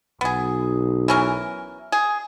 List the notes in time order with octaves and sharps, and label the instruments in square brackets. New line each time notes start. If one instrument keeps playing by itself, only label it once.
[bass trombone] B1 [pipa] B3 G#4
[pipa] E3 C#4 A#4
G#4